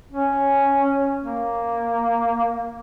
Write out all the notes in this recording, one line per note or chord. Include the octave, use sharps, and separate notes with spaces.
C#4
A#3